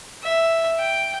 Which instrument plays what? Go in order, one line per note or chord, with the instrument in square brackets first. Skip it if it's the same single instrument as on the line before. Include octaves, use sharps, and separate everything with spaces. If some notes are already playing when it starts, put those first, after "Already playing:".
[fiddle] E5
G5